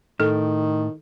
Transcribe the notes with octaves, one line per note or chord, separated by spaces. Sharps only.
A2 D#3 A4